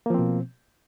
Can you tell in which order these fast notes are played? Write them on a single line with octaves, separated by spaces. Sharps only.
A#3 F3 C4 B2